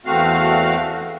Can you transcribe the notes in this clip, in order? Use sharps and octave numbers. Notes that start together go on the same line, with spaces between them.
E2 A3 C4 F#4 F5